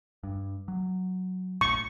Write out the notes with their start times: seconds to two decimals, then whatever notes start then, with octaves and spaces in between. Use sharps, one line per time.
0.24 G2
0.68 F#3
1.61 A#1 A2 C#6